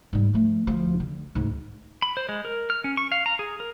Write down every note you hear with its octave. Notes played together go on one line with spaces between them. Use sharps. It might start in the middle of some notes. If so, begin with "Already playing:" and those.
G#2 G3
F3 A3
D2 F3
D3
D2 G#2
B5
C5
G#3
A#4
F6
C#4
C#6
F5
A#5
G#4
A#4